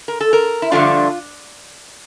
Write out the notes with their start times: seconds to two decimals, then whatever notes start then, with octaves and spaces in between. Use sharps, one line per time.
0.08 A#4
0.21 A4
0.33 A#4
0.62 E4
0.72 G2 D3 F3 A3 D4 F4